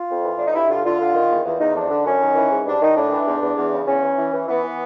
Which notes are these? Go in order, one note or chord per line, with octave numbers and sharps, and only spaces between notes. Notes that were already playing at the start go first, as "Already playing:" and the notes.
Already playing: F4
F2
E3
A2 D4
D#4
G2 E4
D3 F4
D3 F4
D3
D#3
E2
E2
E2 D#4
F2 D4
D3
F#2 C#4
D#3
E3
G#2
G2 D4
D#3 D#4
A2 D4
E3
E2
E2
E2
C#3
E2 C#4
E3
E3
E3
E3 B3
E3